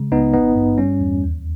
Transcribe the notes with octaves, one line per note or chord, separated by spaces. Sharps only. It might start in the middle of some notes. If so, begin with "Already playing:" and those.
Already playing: C#3 G#3
C#2 B3 D#4
G#1 B3 D#4
G2
G3 C#4
E2
D#2